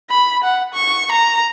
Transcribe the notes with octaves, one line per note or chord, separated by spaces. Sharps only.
B5
F#5
C#6
A#5